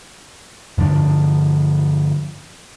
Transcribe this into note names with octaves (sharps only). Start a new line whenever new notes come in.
G2 D3 F3 D4